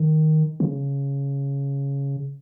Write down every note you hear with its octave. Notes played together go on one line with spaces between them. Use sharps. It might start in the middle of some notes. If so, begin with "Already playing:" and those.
Already playing: D#3
C#3